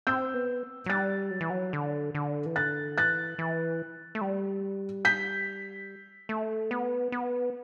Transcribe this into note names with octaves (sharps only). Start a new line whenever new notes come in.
C4 E6 G6
B3
F#3
G3 F#6 A6
F#3
E3
F#3
D3
D3
E3
D3 F#6 A6
E3 F#6 A6
E3
A3
G3
G6 B6
A3
B3
B3